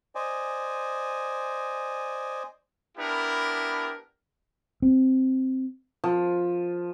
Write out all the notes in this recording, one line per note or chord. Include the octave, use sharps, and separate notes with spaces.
C5 D5 D#5 G#5
B3 D4 E4 G4 A#4
C4
F3